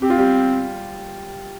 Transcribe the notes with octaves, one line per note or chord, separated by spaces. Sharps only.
C4 G4
F4
G3 G4